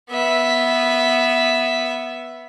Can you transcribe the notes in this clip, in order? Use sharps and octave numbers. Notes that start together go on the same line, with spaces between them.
B3 E5